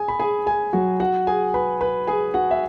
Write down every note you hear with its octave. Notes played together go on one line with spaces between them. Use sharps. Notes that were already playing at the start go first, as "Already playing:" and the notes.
Already playing: G#4 G#5
B5
G#4 G#5
G#4 G#5
F#3 F#4
F#4 F#5
G#4 G#5
B4 B5
B4 B5
G#4 G#5
F#4 F#5
E5